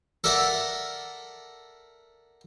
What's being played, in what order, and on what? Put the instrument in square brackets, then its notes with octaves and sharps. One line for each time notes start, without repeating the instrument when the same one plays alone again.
[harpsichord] A4 A#4 D5 E5 F#5 A5